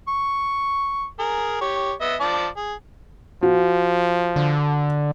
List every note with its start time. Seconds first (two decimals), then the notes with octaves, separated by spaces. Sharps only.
0.08 C#6
1.19 G#4 A#4
1.61 G4 C#5
2.01 B3 D#5 E5
2.20 F3 D5 A5
2.57 G#4
3.43 F3 F#4
4.36 D3